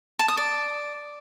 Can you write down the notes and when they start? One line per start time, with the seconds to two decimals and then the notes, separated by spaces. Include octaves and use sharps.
0.19 A5
0.28 D#6
0.37 D5